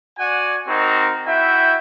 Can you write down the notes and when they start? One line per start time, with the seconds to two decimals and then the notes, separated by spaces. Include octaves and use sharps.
0.18 F#4 D5 F#5 G#5
0.68 C4 D#4 F#4 A#4
1.27 E4 F#4 E5 G5